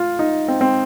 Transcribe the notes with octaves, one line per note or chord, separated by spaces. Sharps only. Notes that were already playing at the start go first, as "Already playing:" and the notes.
Already playing: F4
D#4
C4
C4